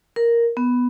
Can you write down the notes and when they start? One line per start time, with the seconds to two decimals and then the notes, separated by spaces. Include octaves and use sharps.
0.16 A#4
0.57 B3